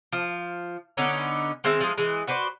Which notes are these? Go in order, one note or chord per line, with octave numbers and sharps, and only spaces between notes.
F3
D3 B3 C#4 D#4
D#3 G#3 C4 E5
F3 G#3
E3 G#3
F#4 B4 C5 D5